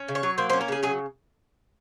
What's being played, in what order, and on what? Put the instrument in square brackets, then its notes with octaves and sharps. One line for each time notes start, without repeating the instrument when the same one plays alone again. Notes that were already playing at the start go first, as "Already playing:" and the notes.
Already playing: [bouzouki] C#4
C#3
C#5
F#3
A#3 C5
C#4 C5
A#4
C#3 G#4
F#3 G#4